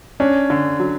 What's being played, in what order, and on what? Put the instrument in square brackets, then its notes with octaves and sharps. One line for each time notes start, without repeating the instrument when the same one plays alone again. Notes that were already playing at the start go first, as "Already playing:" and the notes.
[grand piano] C#4 [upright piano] D4
[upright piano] D3
F#3